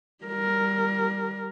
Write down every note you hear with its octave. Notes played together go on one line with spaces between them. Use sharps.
G3 A#4